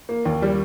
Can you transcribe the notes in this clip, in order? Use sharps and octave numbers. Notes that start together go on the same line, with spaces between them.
A#3
D#2
G3